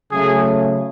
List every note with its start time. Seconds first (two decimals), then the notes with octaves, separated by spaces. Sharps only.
0.11 C#3 F#3 A3 G#4